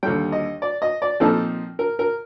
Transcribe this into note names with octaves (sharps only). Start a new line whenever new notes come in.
D#2 D3 G3 G5
D#5
D5
D#5
D5
A#2 F3 C4 D#4 A4
A#4
A#4